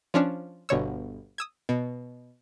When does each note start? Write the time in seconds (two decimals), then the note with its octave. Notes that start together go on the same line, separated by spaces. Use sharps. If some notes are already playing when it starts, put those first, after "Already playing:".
0.14 F3 C#4 D4
0.69 G1 B2 D3 C#5 E6
1.38 D#6 E6 G#6
1.69 B2